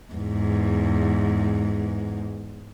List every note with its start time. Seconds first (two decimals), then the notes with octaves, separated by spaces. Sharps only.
0.14 E2 G#2